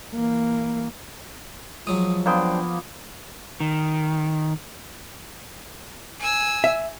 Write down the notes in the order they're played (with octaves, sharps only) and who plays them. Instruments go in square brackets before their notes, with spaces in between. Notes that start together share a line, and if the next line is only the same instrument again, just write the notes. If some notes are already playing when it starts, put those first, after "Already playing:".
[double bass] E3 A#3
[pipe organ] F3 [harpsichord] F#3 G#3 [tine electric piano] D#6
[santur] A#3 B3 [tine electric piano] D4 C5 G5
[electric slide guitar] D#3
[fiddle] G#5 E6
[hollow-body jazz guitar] E5